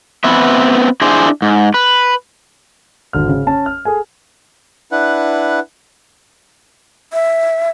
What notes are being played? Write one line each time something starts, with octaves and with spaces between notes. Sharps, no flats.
B3 C4 B4 E5
D4 E4 G#4 C5
G#2
B4
G#1 D3 F6
C#3
C#4 A5
F6
G#4 A4 G#5
D4 E4 B4 F#5
E5